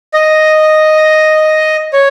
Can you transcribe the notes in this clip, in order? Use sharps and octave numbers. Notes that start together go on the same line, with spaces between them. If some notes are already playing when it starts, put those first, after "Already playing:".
D#5
C#5